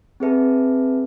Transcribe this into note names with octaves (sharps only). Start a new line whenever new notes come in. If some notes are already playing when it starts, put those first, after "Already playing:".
C4 G#4 B4 E5 A5